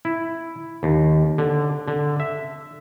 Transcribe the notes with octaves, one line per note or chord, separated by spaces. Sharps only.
E4
D#2
D3
D3
E5